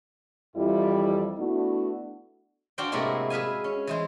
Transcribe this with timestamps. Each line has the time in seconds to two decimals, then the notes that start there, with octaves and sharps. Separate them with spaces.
0.56 F2 E3 F3 G3 E4
1.39 A3 B3 D4 E4 F#4
2.78 D4 F#4 C5 F5 G5
2.92 A2 C3 G#3 A#3 E4 F#4
3.30 G#4 B4 E5 F5 G#5
3.64 C#4
3.87 E3 G#3 C5